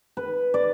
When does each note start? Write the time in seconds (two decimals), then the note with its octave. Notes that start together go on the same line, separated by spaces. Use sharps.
0.17 B4
0.54 D5